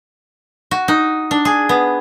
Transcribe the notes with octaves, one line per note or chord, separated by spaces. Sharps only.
F#4
D#4
D4
G#4
B3